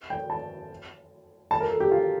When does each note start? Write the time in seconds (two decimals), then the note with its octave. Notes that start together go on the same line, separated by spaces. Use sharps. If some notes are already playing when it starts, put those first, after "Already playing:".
0.10 G5
0.30 A5
1.51 A5
1.60 A#4
1.70 A4
1.80 G4
1.91 F4